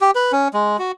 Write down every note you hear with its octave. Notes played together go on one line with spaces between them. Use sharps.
G4
B4
C#4
G#3
F#4